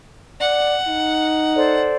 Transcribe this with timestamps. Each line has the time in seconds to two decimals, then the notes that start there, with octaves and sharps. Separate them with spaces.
0.40 D5 F#5
0.88 D#4
1.54 A4 C5 D5